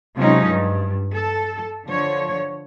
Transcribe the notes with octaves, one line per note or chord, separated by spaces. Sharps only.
C3 F3 F#3 G#3 C#4 D#4
G2
A4
D3 F3 C#5